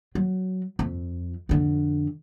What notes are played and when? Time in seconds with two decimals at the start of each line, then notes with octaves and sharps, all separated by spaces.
0.15 F#3
0.79 F2
1.49 F2 D3